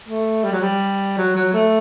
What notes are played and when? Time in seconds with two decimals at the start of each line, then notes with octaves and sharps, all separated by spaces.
0.08 A3
0.44 G3
0.52 F#3
0.61 G3
1.18 F#3
1.35 F#3
1.53 A3